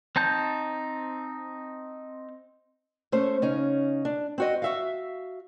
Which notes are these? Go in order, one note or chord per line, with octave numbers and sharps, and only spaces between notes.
C4 D#4 A5 G6
A3 C#4 C5
C#3 C#4 D#4
D4
C4 F#4 D#5
F#4 E5 F5